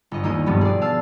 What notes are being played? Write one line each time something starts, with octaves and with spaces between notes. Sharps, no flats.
G1 D#5
D#2 A#3 D#4 D#6
G2 B2 F3 G3 B3
G#4 D5
F5 A5 E6